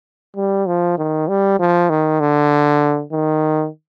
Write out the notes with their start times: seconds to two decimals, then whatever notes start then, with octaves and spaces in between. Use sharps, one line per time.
0.36 G3
0.67 F3
0.98 D#3
1.28 G3
1.59 F3
1.90 D#3
2.20 D3
3.12 D#3